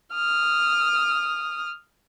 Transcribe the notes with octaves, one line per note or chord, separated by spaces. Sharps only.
D#6 F6